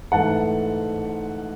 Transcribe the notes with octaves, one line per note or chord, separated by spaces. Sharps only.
G#2 E3 A3 F#5 A5